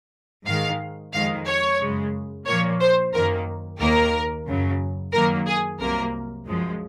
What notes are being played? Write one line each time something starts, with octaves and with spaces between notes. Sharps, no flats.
G#2 D#3 G#3 F5
F2 D#3 G#3 F5
C#5
F#2 C#3 G#3
A#2 F3 A#3 C#5
C5
F#2 D#3 A#3 A#4
D#2 D#3 A#3 A#4
F#2 C#3 F#3
F#2 D#3 F#3 A#3 A#4
G#4
C2 C3 F#3 A#3 A#4
F#2 F3 G#3